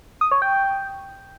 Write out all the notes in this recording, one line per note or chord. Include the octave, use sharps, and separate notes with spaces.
D#6
C#5
G5